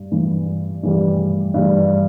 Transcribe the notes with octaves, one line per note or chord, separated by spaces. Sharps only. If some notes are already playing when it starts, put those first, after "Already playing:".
Already playing: G2 G3
G2 E3 G3
G2 E3 G3
G2 E3 G3